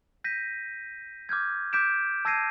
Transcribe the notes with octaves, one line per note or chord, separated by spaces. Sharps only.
G6 A#6 B6 D#7
D6 F6 G6 G#6
D6 F6 G6 B6 D7 E7
A5 E6 G#6 A#6 C7 D#7